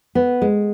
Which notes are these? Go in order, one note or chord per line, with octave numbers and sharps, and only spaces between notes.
B3
G#3